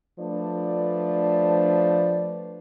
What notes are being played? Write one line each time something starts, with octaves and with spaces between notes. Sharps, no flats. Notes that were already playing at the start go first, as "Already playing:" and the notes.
F3 A3 D4 B4 D5